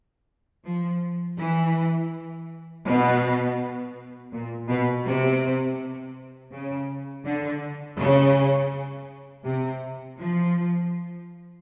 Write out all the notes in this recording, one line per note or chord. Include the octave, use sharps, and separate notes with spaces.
F3
E3
B2
A#2
B2
C3
C#3
D3
C#3
C3
F3